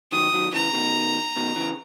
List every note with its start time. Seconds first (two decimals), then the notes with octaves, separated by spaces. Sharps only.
0.12 D#3 F#3 D#6
0.33 D#3 F#3
0.53 C#3 E3 A#5
0.73 B2 D#3
1.36 B2 D#3
1.56 C#3 E3